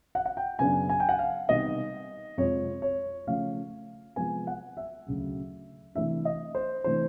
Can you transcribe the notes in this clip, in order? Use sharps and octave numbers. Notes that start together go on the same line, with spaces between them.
F#5
F#5
G5
F#2 C#3 F#3 B3 D4 G#5
G#5
G5
F#5
F5
C3 D#3 G3 B3 D#5
F2 C3 F3 G#3 C#5
C#5
C#3 F3 A3 C#4 F5
C3 F3 G#3 B3 G#5
F#5
E5
D2 C#3 F#3
C3 E3 A3 D4 E5
D#5
C5
C3 E3 A3 D4 C5